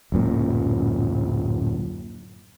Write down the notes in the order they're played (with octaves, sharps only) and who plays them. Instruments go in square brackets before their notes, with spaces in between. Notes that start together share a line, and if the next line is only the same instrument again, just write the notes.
[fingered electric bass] D1 F#2 A#2